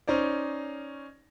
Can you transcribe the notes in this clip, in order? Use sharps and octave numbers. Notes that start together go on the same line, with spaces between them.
C#4 D#4 C5 D5